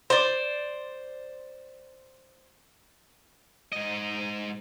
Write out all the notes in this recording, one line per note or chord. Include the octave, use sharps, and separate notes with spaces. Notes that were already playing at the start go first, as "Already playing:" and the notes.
C5 D5
G#2 D#5